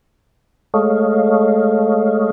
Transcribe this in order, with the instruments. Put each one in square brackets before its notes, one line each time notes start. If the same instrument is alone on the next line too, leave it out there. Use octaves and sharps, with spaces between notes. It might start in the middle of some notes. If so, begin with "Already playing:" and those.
[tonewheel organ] G#3 A3 A4 C#5 D#5 F5